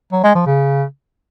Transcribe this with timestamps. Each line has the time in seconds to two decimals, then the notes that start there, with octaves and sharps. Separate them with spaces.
0.12 F#3
0.23 G#3
0.35 F3
0.46 C#3